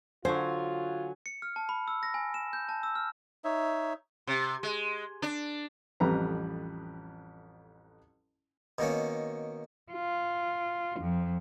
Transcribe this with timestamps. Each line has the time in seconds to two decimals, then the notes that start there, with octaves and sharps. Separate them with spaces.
0.25 D3 F#3 F4 C5 G#5
1.26 C#7
1.42 F6
1.56 A5
1.69 B5
1.88 E6
2.03 A#6
2.14 G#5
2.34 E7
2.53 G6
2.69 A5
2.83 E6
2.95 F6
3.44 D#4 C#5 E5
4.27 C3
4.63 G#3
5.22 D4
6.00 A1 F2 G3 B4 A#5
8.78 B2 D#3 A#3 C#4
9.92 F4
10.99 F2